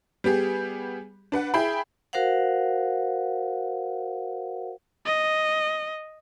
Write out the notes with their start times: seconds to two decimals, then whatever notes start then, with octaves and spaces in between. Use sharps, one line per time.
0.24 G3 B3 G4 G#4
1.32 D4 B4 F#5
1.54 E4 G#4 G5 B5
2.13 F#4 A#4 C5 F5 F#5
5.06 D#5